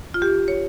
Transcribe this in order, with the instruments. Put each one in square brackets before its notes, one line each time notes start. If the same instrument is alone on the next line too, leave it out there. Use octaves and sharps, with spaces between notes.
[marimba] F4
G4
C#5